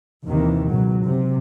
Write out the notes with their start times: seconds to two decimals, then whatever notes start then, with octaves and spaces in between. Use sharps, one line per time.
0.25 D#2 C3 D#3 E3
0.70 C#2 B2 F#3
1.04 C3